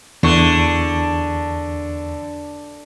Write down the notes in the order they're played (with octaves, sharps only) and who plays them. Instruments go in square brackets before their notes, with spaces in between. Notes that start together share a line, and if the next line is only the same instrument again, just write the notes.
[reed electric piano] E2 C#6 [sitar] D3